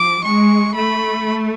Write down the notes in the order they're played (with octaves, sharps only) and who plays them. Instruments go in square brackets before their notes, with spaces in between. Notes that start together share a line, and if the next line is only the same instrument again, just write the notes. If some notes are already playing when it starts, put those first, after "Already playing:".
Already playing: [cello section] F3 [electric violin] D6
[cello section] G#3 [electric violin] C#6
[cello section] A3 [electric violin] B5